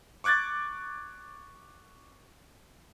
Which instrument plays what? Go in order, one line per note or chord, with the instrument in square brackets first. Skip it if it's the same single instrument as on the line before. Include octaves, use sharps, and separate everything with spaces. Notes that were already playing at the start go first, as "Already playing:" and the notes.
[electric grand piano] C#6 D6 F#6 G#6 A6